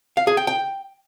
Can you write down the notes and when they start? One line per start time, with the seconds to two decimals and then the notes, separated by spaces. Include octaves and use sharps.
0.17 F5
0.27 G#4
0.37 G5
0.47 G5